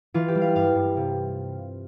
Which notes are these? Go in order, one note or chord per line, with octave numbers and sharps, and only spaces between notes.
E3 F4
G4
G3
F5
G2 F5
G2
C3